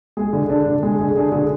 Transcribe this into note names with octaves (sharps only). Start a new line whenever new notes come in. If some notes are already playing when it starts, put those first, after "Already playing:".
G#3 G#4
D3
D4
D3
G#3 G#4
D3 G#4
D4 G#4
D3 G#4